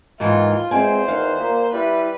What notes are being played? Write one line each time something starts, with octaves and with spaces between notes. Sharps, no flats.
D#2 G#2 D#3 E3 F4
E2 G#3 C4 C5 G#5
D#3 F5 F#5
A#2 A#3
G3 E4 B4